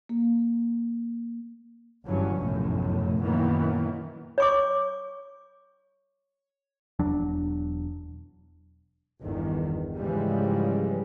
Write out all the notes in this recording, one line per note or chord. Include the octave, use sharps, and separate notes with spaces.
A#3
G1 G2 E3 F#3 C#4
F1 B1 F#2 A2
F#2 A#2 D#3 E3 A#3 B3
C#5 C#6 D6
E1 E2 F#3 D4
G1 E2 D#3
G#2 C#3 E3 F3 G3 G#3